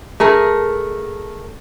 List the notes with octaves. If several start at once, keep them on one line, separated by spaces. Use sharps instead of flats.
A3 G#4 A#4